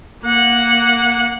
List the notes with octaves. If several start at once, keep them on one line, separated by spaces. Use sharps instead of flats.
A#3 F#5